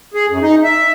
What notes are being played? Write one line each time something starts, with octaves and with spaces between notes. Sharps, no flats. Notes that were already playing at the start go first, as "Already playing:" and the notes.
G#4
F#2
D#4
E5